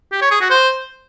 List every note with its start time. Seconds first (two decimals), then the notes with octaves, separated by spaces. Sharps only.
0.12 G4
0.22 C#5
0.31 G#4
0.41 F#4
0.50 C5